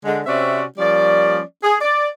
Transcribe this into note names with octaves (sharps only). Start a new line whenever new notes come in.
D3 G#3
C3 C4 C#4 F#4 D5 E5
F3 G3 A#3 C#4 D5
G#4
D5